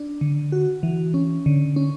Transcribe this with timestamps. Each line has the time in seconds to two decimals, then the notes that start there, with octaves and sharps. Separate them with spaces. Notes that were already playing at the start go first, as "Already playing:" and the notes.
Already playing: D4
0.21 D3
0.52 F#4
0.83 E3
1.14 C#4
1.46 D3
1.76 C#4